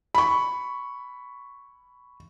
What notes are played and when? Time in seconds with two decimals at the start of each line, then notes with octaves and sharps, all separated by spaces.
0.15 B5 C#6